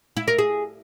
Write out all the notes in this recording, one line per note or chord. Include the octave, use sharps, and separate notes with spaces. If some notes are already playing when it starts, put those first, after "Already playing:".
E4
A#4
G#4